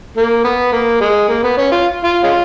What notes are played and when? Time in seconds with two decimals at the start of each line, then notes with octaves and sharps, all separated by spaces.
0.17 A#3
0.44 B3
0.72 A#3
1.01 G#3
1.29 A#3
1.43 B3
1.58 C#4
1.72 F4
2.04 F4
2.23 G#3 C#4 F4